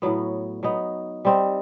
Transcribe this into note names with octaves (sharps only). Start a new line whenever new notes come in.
A2 F#3 B3
F#3 B3 D#4
G3 C4 D#4